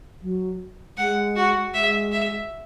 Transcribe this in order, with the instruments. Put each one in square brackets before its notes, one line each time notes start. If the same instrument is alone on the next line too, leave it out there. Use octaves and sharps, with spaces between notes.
[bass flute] F#3
[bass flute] G#3 [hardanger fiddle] F#5
[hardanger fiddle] F#4
[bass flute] G#3 [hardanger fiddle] E5
[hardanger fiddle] E5